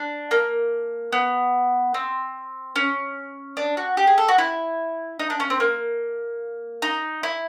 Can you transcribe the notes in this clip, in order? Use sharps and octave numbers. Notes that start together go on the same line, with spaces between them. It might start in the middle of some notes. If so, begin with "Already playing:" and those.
Already playing: D4
A#3
B3
C4
C#4
D4
F#4
G4
G#4
A4
F#4
E4
D#4
D4
C#4
C4
A#3
D#4
E4